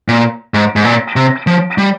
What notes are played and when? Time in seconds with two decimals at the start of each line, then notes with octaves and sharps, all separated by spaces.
0.08 A#2
0.54 G#2
0.76 G#2
0.85 A#2
1.16 C3
1.47 F3
1.78 G3